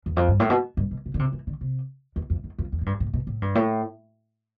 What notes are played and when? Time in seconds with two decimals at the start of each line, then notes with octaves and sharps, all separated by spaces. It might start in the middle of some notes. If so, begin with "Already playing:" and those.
0.06 E2
0.16 F2
0.28 G2
0.40 A2
0.50 B2
0.77 G2
0.91 B2
1.06 C3
1.14 D3
1.19 C3
1.33 E3
1.47 D3
1.61 C3
2.16 E2
2.30 F2
2.44 E2
2.58 F2
2.72 E2
2.81 A2
2.86 G2
3.00 A2
3.14 B2
3.27 A2
3.42 G2
3.55 A2